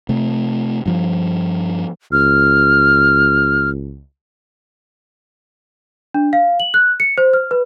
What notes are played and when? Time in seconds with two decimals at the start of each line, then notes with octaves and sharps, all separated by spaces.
0.09 C3 A3
0.86 G2 F3
2.12 C#2 F6
6.14 D4
6.33 F5
6.60 F#7
6.74 F#6
7.00 C#7
7.18 C5
7.34 F6
7.51 B4